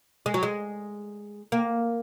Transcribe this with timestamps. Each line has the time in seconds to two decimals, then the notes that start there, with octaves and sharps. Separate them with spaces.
0.26 G#3
0.34 F#3
0.43 G#3
1.52 A#3